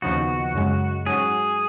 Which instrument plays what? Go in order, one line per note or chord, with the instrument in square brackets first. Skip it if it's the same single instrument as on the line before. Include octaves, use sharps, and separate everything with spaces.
[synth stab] D#2 C#3 F3 B3 D#4 [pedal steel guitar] F#4
[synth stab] F#2 C#3 G#3
[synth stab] G#2 F#3 C#4 F#4 [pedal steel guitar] G#4